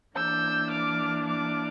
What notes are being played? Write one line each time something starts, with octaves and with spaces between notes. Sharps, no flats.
E3 A#3 D4 E6 G6
D6 F6
D6 F6